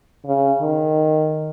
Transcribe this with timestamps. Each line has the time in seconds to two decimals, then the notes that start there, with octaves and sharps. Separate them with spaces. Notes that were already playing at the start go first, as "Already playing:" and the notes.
0.26 C#3
0.61 D#3